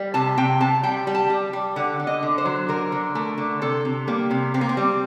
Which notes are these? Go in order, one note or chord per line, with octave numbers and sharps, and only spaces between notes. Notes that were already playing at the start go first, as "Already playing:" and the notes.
Already playing: G3
C3 A5
C3 G5
C3 A5
G3 G5
G3
A5
G3
G3
D3 F#5
D3
D#5
D3
C5
F#3
D3 A#4
D3
A3 A#4
D3
C3 A4
C3
G3 A#3
C3
C3 C4
A#3
C4
G3